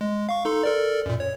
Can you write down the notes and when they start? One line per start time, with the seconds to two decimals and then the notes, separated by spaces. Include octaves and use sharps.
0.01 G#3
0.29 F5 C#6
0.45 D#4 A4 C6
0.63 A4 A#4 D5
1.06 F#2 A#2
1.20 C#5